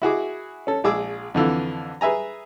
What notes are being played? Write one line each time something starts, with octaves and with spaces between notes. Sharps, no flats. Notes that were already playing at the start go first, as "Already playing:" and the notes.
E4 F#4 G#4 D6
C#4 A4
A#1 G#3 G#4 D6 E6
F2 D3 E3 F4
G#4 B4 E5 G#5 A#5